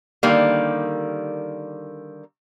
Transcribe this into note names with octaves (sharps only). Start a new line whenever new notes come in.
D3 D#3 G3 A#3